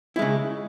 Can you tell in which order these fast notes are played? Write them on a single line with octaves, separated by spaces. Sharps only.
E4 G#3 C#3